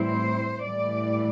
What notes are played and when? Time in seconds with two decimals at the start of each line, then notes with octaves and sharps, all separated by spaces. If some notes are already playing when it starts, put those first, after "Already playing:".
Already playing: A2 E3 G3 C4 E4 C5
0.64 A2 E3 G3 D5